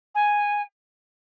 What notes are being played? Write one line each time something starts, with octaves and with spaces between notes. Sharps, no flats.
G#5